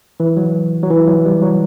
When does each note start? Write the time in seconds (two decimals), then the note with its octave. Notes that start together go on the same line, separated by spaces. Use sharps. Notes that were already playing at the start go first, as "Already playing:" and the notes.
0.20 E3
0.37 F#3
0.83 F#3
0.90 E3
1.07 F#3
1.25 G3
1.42 F#3